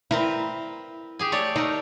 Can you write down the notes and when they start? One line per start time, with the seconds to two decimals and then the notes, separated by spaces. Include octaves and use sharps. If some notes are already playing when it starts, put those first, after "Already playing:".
0.11 C4 E4 A#4 B4
1.19 G4 G#4 G#5
1.32 A3 C#5 D5
1.56 A3 D#4 A#4